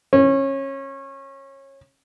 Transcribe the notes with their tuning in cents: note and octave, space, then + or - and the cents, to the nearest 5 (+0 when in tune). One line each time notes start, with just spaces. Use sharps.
C#4 -25